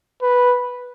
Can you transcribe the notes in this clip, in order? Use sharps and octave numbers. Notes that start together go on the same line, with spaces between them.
B4